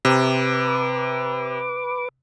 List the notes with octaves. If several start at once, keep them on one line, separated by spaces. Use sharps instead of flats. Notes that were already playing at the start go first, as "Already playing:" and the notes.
C3 B4 D6